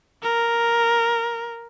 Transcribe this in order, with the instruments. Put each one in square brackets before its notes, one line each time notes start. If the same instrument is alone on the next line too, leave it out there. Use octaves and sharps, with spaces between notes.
[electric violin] A#4